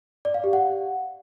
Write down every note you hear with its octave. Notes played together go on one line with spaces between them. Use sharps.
D5
F5
G4
F#5